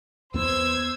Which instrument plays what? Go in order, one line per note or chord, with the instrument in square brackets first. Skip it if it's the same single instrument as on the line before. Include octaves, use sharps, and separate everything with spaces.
[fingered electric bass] E2 B3 [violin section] C5 E6 G#6